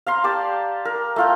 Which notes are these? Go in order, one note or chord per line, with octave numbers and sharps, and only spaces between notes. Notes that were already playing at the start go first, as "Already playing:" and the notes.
F5 A#5 C6
G4 D5 A5
A#4
A3 F4 G5